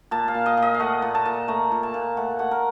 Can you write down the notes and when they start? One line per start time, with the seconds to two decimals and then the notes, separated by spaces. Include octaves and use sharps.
0.11 A#2 A5
0.28 F5
0.34 A#2
0.46 D#5
0.57 A#2 D#5
0.74 F5
0.79 A3 F#5
1.02 A#2
1.15 A5
1.25 A#2
1.48 A3 A#5
1.72 A#2
1.83 A5
1.94 A#2
2.17 A3 F#5
2.39 A3 F#5
2.51 A#4